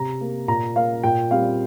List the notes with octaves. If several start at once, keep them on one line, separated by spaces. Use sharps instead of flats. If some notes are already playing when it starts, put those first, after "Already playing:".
Already playing: C3 A#5
A#3
A#2 A#5
A#3 F5
A#2 G5
G3 C4 F5